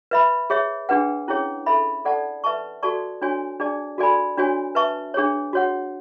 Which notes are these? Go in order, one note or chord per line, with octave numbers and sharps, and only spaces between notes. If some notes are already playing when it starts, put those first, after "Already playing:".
B4 E5 B5
G#4 C#5 E5
D4 G#4 B4 F#5
C#4 E4 G#4 C#5
A4 E5 B5
A4 D5 F#5 A5
B4 E5 A5 C#6
F#4 A4 D5 A5 C#6
D4 F#4 C#5 G#5
D4 G#4 D5 A5
F#4 A4 D5 G#5 B5
D4 F#4 C#5 G#5
B4 E5 A5 C#6
D4 G#4 C#5
F#4 C#5 F#5